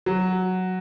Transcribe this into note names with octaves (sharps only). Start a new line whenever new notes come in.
F#3